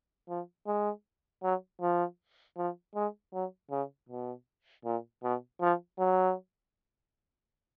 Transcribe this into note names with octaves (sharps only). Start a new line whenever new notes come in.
F3
G#3
F#3
F3
F3
G#3
F#3
C#3
B2
A#2
B2
F3
F#3